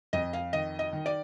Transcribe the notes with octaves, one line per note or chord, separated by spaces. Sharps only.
F2 D#5
F5
D#3 D#5
D#5
D#3
D5